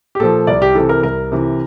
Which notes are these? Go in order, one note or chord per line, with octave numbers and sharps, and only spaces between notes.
G4
A#2 F3 A4
C2 D5
G4
C3 E3 A4
A#4
C2 A#4
C3 E3